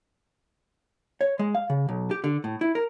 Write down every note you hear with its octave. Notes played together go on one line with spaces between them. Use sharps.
C#5
G#3
F5
C#3
B1
G4
D3
A2
E4
A#4